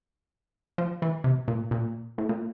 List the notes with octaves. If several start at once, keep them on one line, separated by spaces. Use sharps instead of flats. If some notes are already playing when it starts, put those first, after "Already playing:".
F3
E3
C3
A#2
A#2
A2
A#2